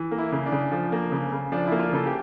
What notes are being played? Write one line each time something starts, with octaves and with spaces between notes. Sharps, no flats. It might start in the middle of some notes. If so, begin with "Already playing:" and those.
Already playing: E3
A#3
E4
C#3
D4
C#3
F3
A#3
C#3
C#3
F3 D4
A#3 E4
F4
C#3 A4
G4